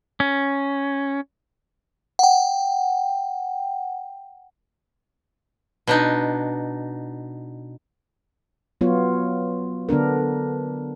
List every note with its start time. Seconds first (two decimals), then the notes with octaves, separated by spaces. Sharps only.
0.20 C#4
2.19 F#5 G5
5.87 B2 D4 D#4
8.81 F#3 B3 F4 C#5
9.89 D3 B3 D4 A#4